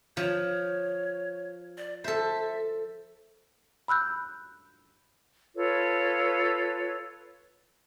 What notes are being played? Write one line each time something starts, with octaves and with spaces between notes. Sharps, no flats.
F3 C#5
D5
A4 C5 E5
B5 E6 F#6 G6
F4 A4 B4 C#5